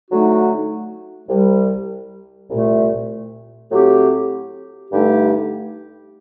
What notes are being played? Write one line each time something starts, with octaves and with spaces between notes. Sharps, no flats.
D3 F#3 A3 D#4 F#4
C2 C3 G3
C2 A#2 A3
A2 F#3 C4 G4
G2 D3 A3 D#4 G4